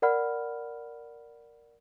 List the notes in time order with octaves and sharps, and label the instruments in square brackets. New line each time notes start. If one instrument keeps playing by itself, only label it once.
[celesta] A#4 D5 F#5 B5 F6